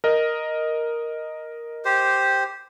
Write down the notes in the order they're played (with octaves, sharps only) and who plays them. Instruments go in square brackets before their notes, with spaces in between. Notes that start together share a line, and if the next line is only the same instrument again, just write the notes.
[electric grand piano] A#4 D#5
[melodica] G4 C5